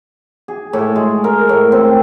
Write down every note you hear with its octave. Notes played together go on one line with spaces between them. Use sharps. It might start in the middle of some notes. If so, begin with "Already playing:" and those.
G#4
A2
G#3
A#4
A2
C4